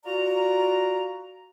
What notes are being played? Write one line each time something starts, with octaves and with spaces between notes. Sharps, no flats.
F4 F#4 D5 A#5